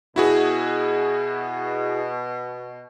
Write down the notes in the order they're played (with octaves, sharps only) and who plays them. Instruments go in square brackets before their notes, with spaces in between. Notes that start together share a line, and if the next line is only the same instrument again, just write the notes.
[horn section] B2 [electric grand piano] E4 F#4 G#4